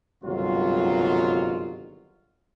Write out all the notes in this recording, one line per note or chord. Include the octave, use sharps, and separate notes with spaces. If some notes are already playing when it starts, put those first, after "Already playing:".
G1 C2 G#2 D#3 F#3 F4